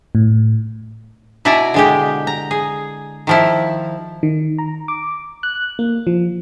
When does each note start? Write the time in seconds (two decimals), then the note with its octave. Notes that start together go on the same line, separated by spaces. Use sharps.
0.15 A2
1.45 B2 E4 D5 G#5 A#5
1.74 D3 G#3 G4
2.27 A#5
2.51 G#4
3.27 D#3 F3 E4
4.23 D#3
4.59 A#5
4.88 D6
5.43 F#6
5.79 A#3
6.07 F3